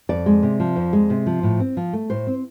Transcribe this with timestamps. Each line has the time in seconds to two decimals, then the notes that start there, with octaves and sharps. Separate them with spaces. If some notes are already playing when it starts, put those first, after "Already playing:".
0.09 F2 D5
0.26 G#3
0.43 C3
0.60 F3
0.76 F2
0.93 G#3
1.10 C3
1.26 F3
1.43 A2
1.60 C4
1.77 F3
1.93 A3
2.10 A2 C5
2.27 C4